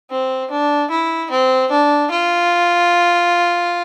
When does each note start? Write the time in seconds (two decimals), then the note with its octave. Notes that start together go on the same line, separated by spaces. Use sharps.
0.11 C4
0.51 D4
0.91 E4
1.31 C4
1.71 D4
2.11 F4